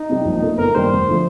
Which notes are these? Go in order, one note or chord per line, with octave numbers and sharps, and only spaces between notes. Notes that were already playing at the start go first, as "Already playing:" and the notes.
Already playing: D#4
C3 G3
A#1
A#2 A3
G1 A#4
G2 D#3 G3 A#3 C5
F1
D3 F3 A3